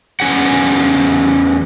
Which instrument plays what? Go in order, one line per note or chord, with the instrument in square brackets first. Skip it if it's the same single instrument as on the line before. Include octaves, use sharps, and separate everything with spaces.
[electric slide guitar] E2 C#4 G#4 F#5